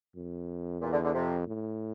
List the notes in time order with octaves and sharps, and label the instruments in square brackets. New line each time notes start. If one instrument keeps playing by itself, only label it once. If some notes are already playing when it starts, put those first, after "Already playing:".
[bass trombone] F2
[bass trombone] E2 [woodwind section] A#2
[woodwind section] D3
D3
[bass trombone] F2 [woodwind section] C3
[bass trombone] A2